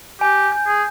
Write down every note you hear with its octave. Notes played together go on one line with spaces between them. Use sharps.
G4 G#5
G6
G#4